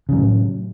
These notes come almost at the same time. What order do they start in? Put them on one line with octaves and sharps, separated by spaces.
C#3 F#3 A2